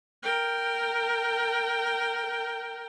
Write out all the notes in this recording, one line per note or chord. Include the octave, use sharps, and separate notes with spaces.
A#4 G5